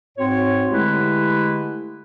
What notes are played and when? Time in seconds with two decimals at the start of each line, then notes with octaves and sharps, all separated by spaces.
0.18 G#2 C4 F#4 C#5
0.72 D3 G#3 A3 E4 G4 B4